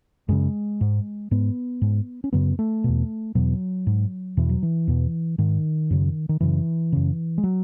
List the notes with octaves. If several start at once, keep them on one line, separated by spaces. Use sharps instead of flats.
F#2 C#3 G#3
G#2
G#2 B3
G#2
C#4
F#2 C#3 B3
A3
E2 B2
E2 B2 F#3
G#2
E2 B2 E3
F#3
E3
E2 B2
G#2 D#3
F#2 C#3
D#3
F#2 C#3 E3
F#2 C#3
G#3
F#3